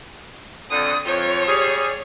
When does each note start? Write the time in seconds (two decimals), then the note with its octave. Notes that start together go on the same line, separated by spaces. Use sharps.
0.70 F2 D3 D#6
1.06 F2 F3 C#5
1.47 G3 G#4